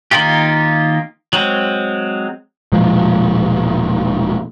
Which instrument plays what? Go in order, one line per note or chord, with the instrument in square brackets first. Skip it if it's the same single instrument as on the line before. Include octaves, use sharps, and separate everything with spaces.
[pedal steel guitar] D#3 A#3 D#4 F4 G4
F#3 G#3 C4
[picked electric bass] E1 A#2 F3 G#3